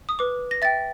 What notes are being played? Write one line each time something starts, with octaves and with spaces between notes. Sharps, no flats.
D#6
B4 D6
A#6
E5 G5 A6